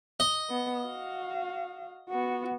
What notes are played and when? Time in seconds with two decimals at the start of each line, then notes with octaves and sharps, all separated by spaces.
0.20 D#5
0.50 B3
0.83 F#4 F5
2.09 B3 F#4